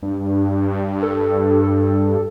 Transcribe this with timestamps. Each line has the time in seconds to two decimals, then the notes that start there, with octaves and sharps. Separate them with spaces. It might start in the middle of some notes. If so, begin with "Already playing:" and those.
0.03 G2
1.02 A4
1.61 A4